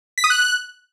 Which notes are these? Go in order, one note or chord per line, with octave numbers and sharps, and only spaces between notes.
B6
D#6
F#6